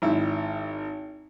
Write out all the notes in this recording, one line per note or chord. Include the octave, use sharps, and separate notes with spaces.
G#1 E4